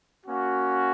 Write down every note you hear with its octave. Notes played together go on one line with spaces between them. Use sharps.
A#3 C#4 F#4